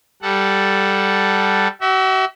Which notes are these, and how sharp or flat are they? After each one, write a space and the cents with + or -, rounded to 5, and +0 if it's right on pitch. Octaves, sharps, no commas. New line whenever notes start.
G3 +0 A4 +0 F#5 +0
F#4 +40 E5 -15